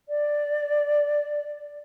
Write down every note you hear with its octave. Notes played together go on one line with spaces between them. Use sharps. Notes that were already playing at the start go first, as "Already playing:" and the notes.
D5